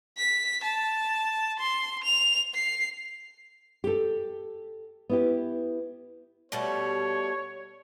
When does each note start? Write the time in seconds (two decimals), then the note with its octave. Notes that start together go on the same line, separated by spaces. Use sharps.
0.17 B6
0.63 A5
1.59 C6
2.04 F7
2.54 C7
3.84 G4 A4
5.09 B3 E4 G4
6.52 B2 G3 A3 C#5